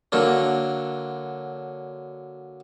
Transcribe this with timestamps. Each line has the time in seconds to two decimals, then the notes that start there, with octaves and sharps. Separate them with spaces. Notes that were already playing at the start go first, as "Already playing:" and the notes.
0.12 D3 F#3 A#3 D4